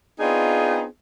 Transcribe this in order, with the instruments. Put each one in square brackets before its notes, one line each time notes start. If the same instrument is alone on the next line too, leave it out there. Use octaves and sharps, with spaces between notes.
[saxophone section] B3 C4 D4 D#4 F4 G#4